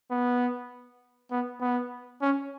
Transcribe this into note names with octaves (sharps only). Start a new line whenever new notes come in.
B3
B3
B3
C#4